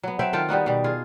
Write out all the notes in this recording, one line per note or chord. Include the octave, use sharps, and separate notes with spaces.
F#3 B3
F#3 C4 E5 G5
D#3 F4 A4 G5
G3 B3 D#4 F#4
B2 G3
F4 G#4